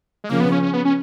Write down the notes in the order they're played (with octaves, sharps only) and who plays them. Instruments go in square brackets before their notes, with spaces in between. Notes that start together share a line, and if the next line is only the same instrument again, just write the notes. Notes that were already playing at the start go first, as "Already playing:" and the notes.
[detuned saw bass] G#3
[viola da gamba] C#3 F3 [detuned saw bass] A#3
[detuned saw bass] B3
C#4
C#4
B3
C#4